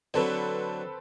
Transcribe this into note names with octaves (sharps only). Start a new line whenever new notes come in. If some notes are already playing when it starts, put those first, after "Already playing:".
D3 F#3 C4 A4 B4